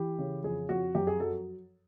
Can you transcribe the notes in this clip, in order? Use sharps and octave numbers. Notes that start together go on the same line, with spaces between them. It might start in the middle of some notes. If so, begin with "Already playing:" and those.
Already playing: E3 G4
C#3
F2 G#4
F2 F#4
F#2 G4
G#4
F#3 A4